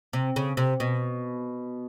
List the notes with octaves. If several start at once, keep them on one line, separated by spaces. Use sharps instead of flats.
C3
C#3
C3
B2